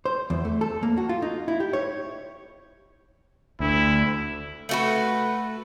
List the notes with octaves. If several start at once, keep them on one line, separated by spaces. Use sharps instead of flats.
C5
E2
A3
A4
A#3
F#4
F4
D#4
E4
G4
C#5
D2 E4
A3 F#4 B4